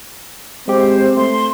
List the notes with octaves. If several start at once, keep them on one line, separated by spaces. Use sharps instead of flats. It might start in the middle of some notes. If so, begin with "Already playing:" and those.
G#3 C4 G4 C5
A3 C6